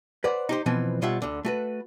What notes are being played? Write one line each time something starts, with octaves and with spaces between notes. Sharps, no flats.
B4 C5 D5 F#5
D#4 G4 C5
B2 E3 F3 B3 C4
B2 G3 F4 C#5 E5 F#5
D2 D3
A3 F#4 B4